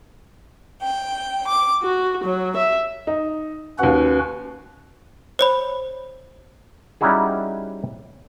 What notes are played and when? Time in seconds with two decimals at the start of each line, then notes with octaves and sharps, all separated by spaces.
0.82 G5
1.47 D6
1.84 F#4
2.24 F#3
2.56 E5
3.07 D#4
3.79 D#2 C#4 F#4 B4 F#5
5.39 C5 C#5 B5
7.01 G3 C#4 D#4 E4 F#4 G#4